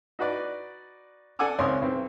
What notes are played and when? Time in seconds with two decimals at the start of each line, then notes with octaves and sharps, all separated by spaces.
0.19 D#4 F#4 B4 D5
1.39 A4 D5 F#5 G#5 D6 E6
1.58 G#1 C#2 C4 C#5 C6 D#6
1.82 B1 C4